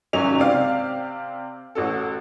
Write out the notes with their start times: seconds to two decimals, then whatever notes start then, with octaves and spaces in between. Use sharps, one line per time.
0.13 G#1 F#3 C#4 D#4 F7
0.37 C3 C4 D5 F5
1.75 A1 F#4 A4